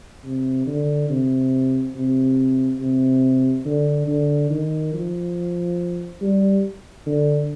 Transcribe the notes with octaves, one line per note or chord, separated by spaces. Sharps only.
C3
D3
C3
C3
C3
D3
D3
D#3
F3
G3
D3